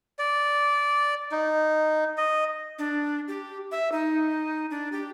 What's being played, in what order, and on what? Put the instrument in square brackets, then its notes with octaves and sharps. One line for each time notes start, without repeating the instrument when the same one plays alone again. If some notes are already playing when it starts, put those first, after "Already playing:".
[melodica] D5
D#4
D#5
[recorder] D4
G4
E5
D#4
D4
G4